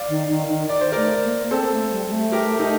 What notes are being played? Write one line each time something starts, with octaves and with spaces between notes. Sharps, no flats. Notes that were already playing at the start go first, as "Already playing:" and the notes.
Already playing: D5 F5
D#3
D#3
D#3
D5
C5
A3 A#4 D5
A#3
C4 A4 C5
A3
G3
G3
A3
G4 A#4
D#4 G4